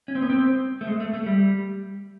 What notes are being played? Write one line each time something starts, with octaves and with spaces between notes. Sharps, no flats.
C#4
C4
B3
C4
A3
G#3
A3
A3
G3